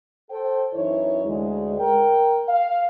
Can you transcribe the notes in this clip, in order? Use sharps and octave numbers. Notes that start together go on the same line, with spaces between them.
A4 C5 G5
F#2 E3 D#4 E4 C#5
D2 G#3
A#4 G5
F5